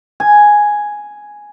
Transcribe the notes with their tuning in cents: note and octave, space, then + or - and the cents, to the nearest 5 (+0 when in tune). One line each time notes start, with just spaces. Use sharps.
G#5 +0